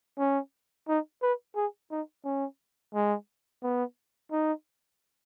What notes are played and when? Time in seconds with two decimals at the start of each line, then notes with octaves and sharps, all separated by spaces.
0.19 C#4
0.89 D#4
1.23 B4
1.56 G#4
1.91 D#4
2.25 C#4
2.95 G#3
3.63 B3
4.32 D#4